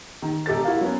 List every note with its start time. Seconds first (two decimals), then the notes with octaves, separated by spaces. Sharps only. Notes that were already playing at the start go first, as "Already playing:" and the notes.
0.22 D#3
0.46 E1 G4 A4 A6
0.65 E4 F#4 A#4 F5
0.81 F#3 B3 C#4